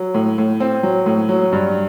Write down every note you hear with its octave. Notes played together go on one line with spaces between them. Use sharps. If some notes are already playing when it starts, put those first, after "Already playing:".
Already playing: F#3
A2
A2
C4
F#3
A2
F#3
G2